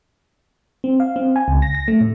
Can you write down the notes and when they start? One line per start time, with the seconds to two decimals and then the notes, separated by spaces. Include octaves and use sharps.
0.84 C4
1.00 F5
1.16 C4
1.36 G#5
1.48 C#2
1.62 A#6
1.75 A#6
1.88 A3
2.01 A2